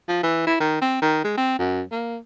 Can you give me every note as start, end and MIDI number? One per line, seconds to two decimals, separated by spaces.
0.08 0.23 53
0.23 0.46 52
0.47 0.57 64
0.60 0.80 51
0.81 1.01 60
1.02 1.22 51
1.24 1.35 56
1.37 1.58 60
1.58 1.82 42
1.91 2.17 58